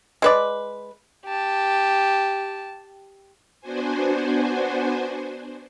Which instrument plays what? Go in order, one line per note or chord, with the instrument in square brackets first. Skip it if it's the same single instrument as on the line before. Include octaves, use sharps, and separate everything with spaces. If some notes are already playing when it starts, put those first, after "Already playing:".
[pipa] G#3 B4 D5
[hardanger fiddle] G4 A5
[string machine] B3 D4 F#4 C5 G#5